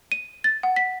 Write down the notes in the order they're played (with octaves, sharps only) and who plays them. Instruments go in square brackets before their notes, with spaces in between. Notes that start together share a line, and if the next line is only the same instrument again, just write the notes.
[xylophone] D#7
A6
F#5
B6